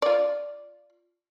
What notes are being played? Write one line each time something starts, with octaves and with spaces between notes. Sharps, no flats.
F4 D5